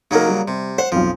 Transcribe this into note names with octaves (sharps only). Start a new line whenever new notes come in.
C#3 F#3 A#3 D#4 A#4
G3
C3
C5 F#5
B1 F2 F3